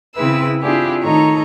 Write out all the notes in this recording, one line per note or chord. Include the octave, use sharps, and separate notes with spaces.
C#3 C4 E4 G#4 B4 E6
C4 D4 E4 F4 G4 G#4
A2 D#3 D#4 A4 C#5 A#5